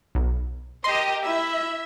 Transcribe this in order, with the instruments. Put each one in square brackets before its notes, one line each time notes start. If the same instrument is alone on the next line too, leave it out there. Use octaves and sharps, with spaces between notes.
[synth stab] B1
[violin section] G4 A#4 D#5 [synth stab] C6
[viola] E4 [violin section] E5